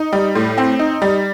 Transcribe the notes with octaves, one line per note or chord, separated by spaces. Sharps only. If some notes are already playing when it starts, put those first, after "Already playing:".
Already playing: D#4
G3
A2
C4
D#4
G3